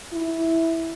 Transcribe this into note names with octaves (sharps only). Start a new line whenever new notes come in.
E4